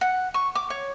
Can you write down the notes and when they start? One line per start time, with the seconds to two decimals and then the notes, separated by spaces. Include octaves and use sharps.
0.01 F#5
0.34 C#6
0.55 D6
0.70 C#5